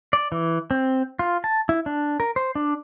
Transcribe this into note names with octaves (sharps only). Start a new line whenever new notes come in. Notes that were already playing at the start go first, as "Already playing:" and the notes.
D5
E3
C4
F4
A5
E4
D4
A#4
C5
D4